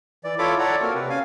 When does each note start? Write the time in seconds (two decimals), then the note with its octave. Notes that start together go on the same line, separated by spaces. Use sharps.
0.24 E3 D5
0.38 E4 F4 A4 C#5 B5 D6
0.59 A4 C#5 D5 F#5 A#5
0.81 A#3 C4 F#4 A#4
0.95 C3 B4
1.09 C#4 F5 G#5